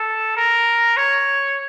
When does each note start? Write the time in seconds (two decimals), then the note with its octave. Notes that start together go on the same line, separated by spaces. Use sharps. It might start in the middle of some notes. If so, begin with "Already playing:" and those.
Already playing: A4
0.37 A#4
0.97 C#5